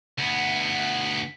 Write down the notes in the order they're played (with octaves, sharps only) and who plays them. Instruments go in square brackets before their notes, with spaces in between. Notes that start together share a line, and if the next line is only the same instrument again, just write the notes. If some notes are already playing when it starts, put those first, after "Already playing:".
[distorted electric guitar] D2 B3